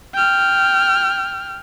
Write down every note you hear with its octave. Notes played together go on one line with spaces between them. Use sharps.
G5 F6